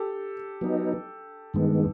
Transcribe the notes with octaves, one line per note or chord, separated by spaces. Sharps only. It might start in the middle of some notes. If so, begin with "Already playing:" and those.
Already playing: G4 A4
F#3 B3 D#4
G2 D#3 G#3 B3